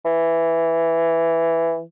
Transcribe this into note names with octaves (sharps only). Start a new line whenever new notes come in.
E3